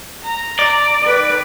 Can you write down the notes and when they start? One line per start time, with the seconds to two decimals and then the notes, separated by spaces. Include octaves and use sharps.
0.24 A#5
0.59 D5
1.02 D#3 B4